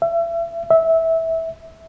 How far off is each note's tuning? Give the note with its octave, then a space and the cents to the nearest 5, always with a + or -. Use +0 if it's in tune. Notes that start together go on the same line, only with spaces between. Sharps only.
E5 +35
E5 -15